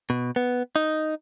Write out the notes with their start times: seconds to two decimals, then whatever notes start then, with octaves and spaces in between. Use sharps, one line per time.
0.10 B2
0.36 B3
0.76 D#4